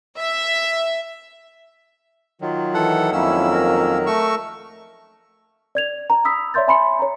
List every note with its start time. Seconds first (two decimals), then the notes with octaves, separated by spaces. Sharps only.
0.18 E5
2.41 D#3 F#3 F4
2.74 E3 A4 F#5
3.13 F2 A#3 C#4 E4 E6
3.51 A#4
4.06 A3 C#6 E6
5.75 D5 G#6 F7
6.10 A#5
6.25 B5 D#6 E6 B6
6.54 C#5 D5 E5 C6 G6 A6
6.67 E5 G#5 B5 C6 C#7
6.99 C#5 A#5